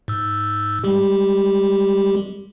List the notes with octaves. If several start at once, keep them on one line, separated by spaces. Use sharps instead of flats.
G#2 E6
G3 G#3 G4